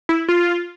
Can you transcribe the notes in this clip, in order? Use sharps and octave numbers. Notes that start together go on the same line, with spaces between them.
E4
F4